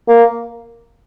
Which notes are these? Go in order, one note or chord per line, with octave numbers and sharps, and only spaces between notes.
A#3